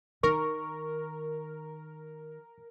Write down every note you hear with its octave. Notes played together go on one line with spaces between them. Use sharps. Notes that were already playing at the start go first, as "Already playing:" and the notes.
D#3 A#4 C#6